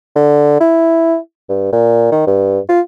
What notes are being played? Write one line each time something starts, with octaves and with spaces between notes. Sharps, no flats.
D3
E4
G2
A#2
D#3
G2
F4